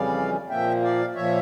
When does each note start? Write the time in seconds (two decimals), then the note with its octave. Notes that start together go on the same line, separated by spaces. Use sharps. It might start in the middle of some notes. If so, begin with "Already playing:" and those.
Already playing: F2 C#3 E3 G3 C#4 D5 F5
0.49 A#2 F3 A#3 E5 G5
0.82 D5 F5
1.15 A#2 F3 A#3 C#5 E5